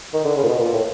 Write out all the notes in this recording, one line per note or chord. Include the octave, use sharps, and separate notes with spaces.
D#3
D3
C#3
A#2
B2
A#2
A2